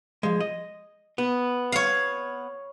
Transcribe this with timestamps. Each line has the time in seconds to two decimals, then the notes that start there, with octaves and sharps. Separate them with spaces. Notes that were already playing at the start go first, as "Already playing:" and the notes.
0.23 F3 G#3
0.40 D#5
1.18 B3
1.72 C#5 F5